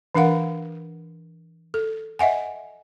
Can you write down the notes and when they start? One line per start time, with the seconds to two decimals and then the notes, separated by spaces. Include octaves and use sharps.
0.15 E3 D4 A#4 F5 F#5
1.74 A4
2.19 D#5 E5 F#5 G#5